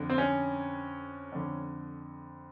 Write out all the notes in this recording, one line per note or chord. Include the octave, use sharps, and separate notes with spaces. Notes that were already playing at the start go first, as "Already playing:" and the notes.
Already playing: F2 D3
C4
C#4
F2 D3